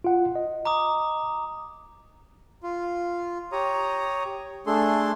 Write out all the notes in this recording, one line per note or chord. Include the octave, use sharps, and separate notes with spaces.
F4 F#5
D#5
A#5 D6 D#6
F4
G4 C#5 A#5 D#6
A3 D4 G#4 A4 C6